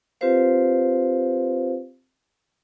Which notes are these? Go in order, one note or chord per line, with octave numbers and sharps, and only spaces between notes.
C4 F4 G4 B4 C5 F5